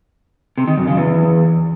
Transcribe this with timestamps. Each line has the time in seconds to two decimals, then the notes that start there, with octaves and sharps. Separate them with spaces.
0.58 C3
0.67 D#3
0.77 F#2
0.87 C#3
0.97 E2